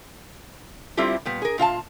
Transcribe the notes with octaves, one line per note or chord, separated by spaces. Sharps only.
G3 A3 C4 E4 F4 G4
A#2 G3 B3
G#4 A#4
A#2 F4 F5 A5